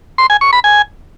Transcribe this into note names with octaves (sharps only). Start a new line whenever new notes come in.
C6
G#5
C#6
B5
G#5